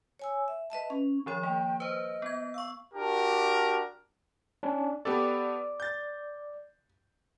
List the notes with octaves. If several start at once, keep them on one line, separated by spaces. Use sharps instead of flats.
C#5 G#5 E6
E5
B4 D#5 E5 A5
C#4
D#3 F3 C#5
A#3 G5
B4 C5 D#5
B3 G#6
F5 C#6 E6
D4 F#4 G4 A#4 A5
C#4 D4
B3 G4 A4 D5
G6 A6